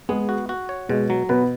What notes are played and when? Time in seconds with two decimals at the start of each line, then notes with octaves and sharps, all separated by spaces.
0.09 G#3 B3 G#4
0.29 F#4
0.49 F#4
0.69 C#5
0.89 B2 G#3 G#4
1.10 F#3
1.29 B2 B3 B4